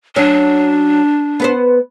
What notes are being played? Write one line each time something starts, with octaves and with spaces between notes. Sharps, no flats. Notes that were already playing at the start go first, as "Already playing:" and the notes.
F#3 C#4 D4
B3 B4 C5